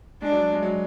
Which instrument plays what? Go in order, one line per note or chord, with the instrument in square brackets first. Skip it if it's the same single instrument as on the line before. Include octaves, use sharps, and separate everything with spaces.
[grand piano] G#3 [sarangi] D4
[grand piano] F#3
G#3
F#3